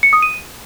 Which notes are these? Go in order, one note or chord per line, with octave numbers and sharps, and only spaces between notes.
C#7
D#6
D#7